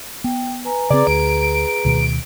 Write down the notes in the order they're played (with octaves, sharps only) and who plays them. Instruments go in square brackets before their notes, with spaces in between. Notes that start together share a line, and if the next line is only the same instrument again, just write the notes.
[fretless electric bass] B3 [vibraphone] G5
[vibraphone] B4 G#5 A#5
[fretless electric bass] C#3 C4 [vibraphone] G#4 B4 A#5 [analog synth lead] D5
[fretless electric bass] D2 [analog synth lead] D7
[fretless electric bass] D2 B2 D#3